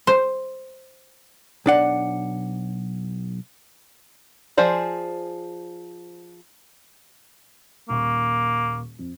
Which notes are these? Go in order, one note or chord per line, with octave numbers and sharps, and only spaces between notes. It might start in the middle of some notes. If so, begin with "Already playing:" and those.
C5
B1 D4 F#5
F3 G#4 C5 D5
D#1 A#3 C#6
F2